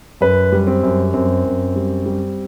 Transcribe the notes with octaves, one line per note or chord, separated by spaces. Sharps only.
F#2 B4
G3
C4
F#2
F#2 C4
F#2
G3
G3